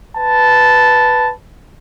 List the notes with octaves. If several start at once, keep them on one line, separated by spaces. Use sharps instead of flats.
B4 A5